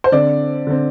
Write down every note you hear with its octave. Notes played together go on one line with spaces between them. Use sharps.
C5
D3 C4 D5
D3 C4